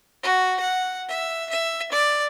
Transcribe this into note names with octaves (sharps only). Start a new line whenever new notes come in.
F#4
F#5
E5
E5
D5